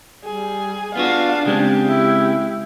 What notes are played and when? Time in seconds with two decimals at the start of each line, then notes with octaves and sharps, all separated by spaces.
0.25 G3 G#4
0.96 B3 D4 F4 F#4 F5
1.46 C#3 G#3 C4 G4
1.87 E4